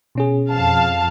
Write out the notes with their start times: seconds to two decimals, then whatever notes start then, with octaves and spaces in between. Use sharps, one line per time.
0.15 B2 C#4 G#4
0.49 F2 F5 A5